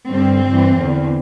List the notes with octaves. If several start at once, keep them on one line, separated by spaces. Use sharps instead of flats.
G2 D3 C4
G2 E3
E2 D3